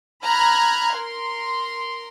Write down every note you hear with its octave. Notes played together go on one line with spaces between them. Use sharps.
A#5 B5 F6 F#6 G#6
A#4 C6